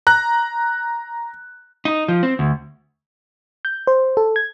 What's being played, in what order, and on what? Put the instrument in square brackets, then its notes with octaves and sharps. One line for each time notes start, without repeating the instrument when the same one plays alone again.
[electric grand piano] A#5 F#6
[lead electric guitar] D#4
F3
C4
D2
[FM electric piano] G6
C5
A4
G#6